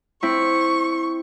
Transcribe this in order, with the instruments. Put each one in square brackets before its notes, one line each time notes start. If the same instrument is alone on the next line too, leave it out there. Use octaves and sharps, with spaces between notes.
[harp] C4 E4 [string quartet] C#6